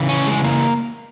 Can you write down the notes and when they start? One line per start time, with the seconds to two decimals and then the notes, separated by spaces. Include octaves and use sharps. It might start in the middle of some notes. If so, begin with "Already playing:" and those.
Already playing: C#3 E3
0.09 C#4
0.27 G#3
0.44 A#3